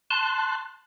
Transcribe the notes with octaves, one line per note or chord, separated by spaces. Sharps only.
A5 C6 F#6